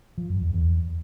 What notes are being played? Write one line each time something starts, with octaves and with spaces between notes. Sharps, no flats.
F3
F#2
E2
E2